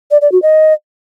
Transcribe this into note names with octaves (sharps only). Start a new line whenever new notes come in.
D5
D5
F#4
D#5